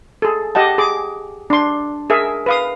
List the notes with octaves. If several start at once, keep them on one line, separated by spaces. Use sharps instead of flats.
G#4 A4
G4 D#5 F#5 A5
G#4 D6
D4 C6
G#4 A#4 E5
B4 F5 D#6